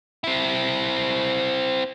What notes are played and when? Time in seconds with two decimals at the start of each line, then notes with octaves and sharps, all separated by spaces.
0.24 C4 E4